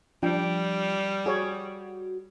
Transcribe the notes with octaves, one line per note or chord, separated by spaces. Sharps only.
F3 G3 D4 G5
F#4 G#4 C#5